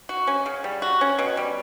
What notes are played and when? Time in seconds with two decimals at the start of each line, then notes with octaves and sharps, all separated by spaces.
0.09 F#4
0.27 C#4
0.46 C#3
0.64 G3
0.82 F#4
1.01 C#4
1.19 B2
1.37 G3